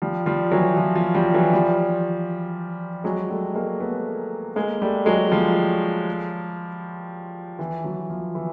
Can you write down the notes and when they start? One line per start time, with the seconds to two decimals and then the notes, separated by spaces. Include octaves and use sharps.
0.02 F3 G3
0.26 F3 G3
0.51 E3 F#3
0.77 F3
0.96 F3
1.15 F3 G3
1.34 E3 F#3
1.53 F3 G3
3.04 F#3 G#3
3.30 G3 A3
3.54 G#3 A#3
3.80 A3 B3
4.56 G#3 A#3
4.82 G3 A3
5.06 F#3 G#3
5.31 F3 G3
7.59 E3
7.84 E3 F#3
8.10 F3
8.35 E3